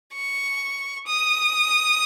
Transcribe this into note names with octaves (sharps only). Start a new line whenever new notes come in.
C#6
D#6